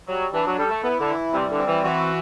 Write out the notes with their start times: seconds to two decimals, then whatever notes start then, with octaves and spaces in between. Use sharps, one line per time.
0.08 F#3 G3
0.33 E3 D4
0.46 F#3
0.58 G3 A4
0.70 A3
0.83 B3 E4
1.00 D3
1.08 E3
1.33 C3 G3
1.50 D3
1.58 C4
1.67 E3
1.83 E3 F#4